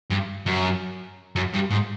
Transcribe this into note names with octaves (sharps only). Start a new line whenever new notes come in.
G2
F#2
F#2
G2
G#2